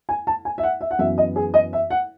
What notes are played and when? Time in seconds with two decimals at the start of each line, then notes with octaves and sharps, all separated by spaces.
0.09 G#5
0.27 A5
0.45 G#5
0.58 E5
0.63 F#5
0.81 E5
0.91 F#5
0.99 F#2 E3 B3 E5
1.18 D#5
1.36 G#4
1.54 D#5
1.73 E5
1.90 F#5